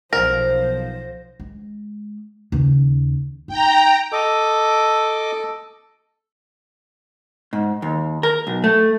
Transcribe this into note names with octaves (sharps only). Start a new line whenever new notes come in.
B1 F3 A#4 C5 A#6
G#3
D#2 C#3
D#4 G5 A#5
A4 D#5 D6
G#2
D#2
A#4
B1
A3